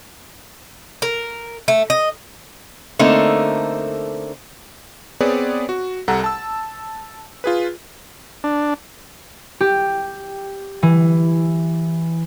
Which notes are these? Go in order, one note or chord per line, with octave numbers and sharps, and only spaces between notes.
A#4
A3
D#5
D3 A3 A#3 C4 D#4
B3 C4 G#4 B4 C#5 D5
F#4
C2 G3 A4 F#5 A#5
A5 E6
F4 G#4 B4
D4
G4
E3